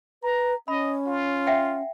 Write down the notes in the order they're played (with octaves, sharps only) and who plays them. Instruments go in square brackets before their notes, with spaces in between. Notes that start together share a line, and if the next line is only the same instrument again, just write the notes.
[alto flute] B4 [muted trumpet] A#5
[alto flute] C#4 [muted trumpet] D#5 [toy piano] B5
[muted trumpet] F4
[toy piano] E5 F#5 G5